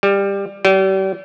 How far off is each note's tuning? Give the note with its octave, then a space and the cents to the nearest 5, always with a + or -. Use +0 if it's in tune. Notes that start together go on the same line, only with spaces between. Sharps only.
G3 +15
G3 -40